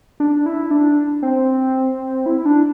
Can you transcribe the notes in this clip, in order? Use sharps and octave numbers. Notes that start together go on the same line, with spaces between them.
D4
E4
D4
C4
E4
D4